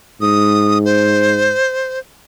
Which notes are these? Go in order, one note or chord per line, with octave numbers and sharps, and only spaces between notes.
G#2 D#6
C5